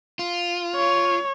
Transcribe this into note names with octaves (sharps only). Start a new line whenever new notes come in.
F4
C#5